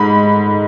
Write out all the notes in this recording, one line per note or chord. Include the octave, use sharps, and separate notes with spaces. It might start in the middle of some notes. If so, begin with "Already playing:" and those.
Already playing: G#2 B5